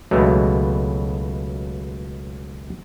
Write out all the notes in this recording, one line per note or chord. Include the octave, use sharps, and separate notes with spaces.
C#2 B2 E3 F#3 G#3 A3